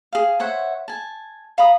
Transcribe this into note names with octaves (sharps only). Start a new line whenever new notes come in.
G#4 F5
C5 C#5 E5 F#5
G#5 A5
F5 A#5 B5 D#6